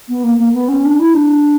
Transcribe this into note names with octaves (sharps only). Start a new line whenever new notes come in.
B3
A#3
A#3
B3
C#4
D4
E4
D4